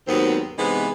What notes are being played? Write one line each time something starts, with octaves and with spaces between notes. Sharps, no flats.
D#2 G#2 F#3 B3 C4
C3 E3 G#3 B3 D#4 G#4